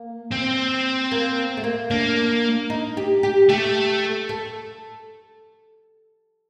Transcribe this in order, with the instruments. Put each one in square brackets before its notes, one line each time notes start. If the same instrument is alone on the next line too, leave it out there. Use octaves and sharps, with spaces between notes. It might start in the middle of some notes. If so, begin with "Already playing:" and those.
Already playing: [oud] A#3
[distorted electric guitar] C4
[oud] A#3
A3
A#3
[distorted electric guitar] A#3 [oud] D4
[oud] D#4
G4
G4
[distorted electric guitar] A3 [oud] G4
[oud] A4